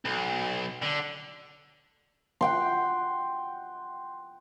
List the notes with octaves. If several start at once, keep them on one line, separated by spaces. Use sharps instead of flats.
B1
D3
F#5 G5 C6